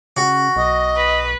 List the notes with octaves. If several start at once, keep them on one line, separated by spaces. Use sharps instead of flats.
C#3 F#4
B1 D#5
B4